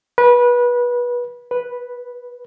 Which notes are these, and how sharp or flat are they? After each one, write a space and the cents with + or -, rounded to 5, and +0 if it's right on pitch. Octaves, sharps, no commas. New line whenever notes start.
B4 -25
B4 -5